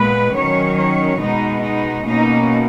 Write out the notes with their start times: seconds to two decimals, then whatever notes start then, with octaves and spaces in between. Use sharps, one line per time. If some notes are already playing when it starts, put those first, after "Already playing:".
Already playing: A#2 G#3 B3 B4
0.35 D#3 F#3 C#4 C#5
0.78 C#5
1.20 B2 G#3 B3 D#4
1.63 D#4
2.05 B2 A#3 C#4 D#4